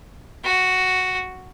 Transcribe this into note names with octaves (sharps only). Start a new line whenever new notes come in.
F#4